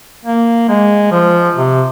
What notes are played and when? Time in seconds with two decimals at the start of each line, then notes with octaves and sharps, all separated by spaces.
0.25 A#3
0.69 G#3
1.12 F3
1.56 C3